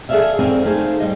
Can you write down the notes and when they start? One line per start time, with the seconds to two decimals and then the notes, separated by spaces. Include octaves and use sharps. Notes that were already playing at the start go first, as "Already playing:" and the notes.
0.09 G#4 A4 C5 D5 E5 F5
0.39 F#2 C4 A#4 D5 F5 G#5
0.65 A3 D#4 G#4 C5 F5
1.00 G3 D#5